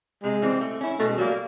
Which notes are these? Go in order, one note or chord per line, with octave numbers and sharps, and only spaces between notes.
C3 G#3
E3 G3 C4
A3
C#4 E4
B2 A3
G#3
F#3 G3 A#3